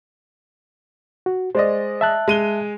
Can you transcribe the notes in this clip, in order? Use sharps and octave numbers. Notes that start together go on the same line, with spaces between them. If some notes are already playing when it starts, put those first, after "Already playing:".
F#4
G#3 C5 D5 D#5
E5 A5 F#6
G#3 D#7 G7